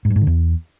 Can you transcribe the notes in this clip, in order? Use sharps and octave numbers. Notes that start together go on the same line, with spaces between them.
G#2
G2
G#2
D3
E2